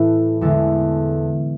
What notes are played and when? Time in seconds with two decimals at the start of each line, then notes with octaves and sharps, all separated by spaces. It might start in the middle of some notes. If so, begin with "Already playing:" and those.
Already playing: A2 E3 A3 A4 B4
0.41 E2 D3 G#3 A4